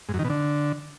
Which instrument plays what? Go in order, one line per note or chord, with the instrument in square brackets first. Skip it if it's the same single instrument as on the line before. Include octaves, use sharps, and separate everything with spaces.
[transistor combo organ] G#2
F#2
D#3
B2
D3